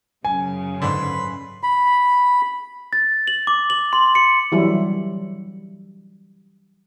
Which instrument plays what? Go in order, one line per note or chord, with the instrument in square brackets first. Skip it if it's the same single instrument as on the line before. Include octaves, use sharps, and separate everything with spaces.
[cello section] F#2 C#3 [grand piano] G#5
[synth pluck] G#2 D3 [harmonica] B4 B5 C6
[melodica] B5
[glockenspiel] A6
F#7
D6
F#7
C6
C#7
[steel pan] E3 F#3 G3 E4